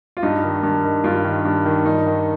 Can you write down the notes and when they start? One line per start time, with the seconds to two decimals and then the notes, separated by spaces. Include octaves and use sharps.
0.17 F4
0.23 G2 D#4
0.43 D#3
0.63 G2
0.84 D#3
1.04 G2 F4
1.25 D#3
1.45 G2
1.66 D#3
1.85 G2 D#4
2.07 D#3